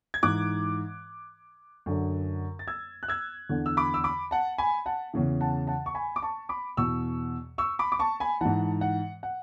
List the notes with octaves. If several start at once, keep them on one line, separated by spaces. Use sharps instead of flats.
G#6
G#2 E3 D6 F#6
F#2 D3
A6
E6 G#6
F#6
E6 G#6
E2 D3
E6
B5 D6
E6
B5 D6
F#5 A5
G#5 B5
F#5 A5
E2 C#3 E3
F#5 A5
F#5 A5
C#6
G#5 B5
D6
A5 C#6
B5 D6
E2 B2 C#6 E6
C#6 E6
B5 D6
D6
A5 C#6
G#5 B5
G#2 E3 F#5 A5
F#5
F#5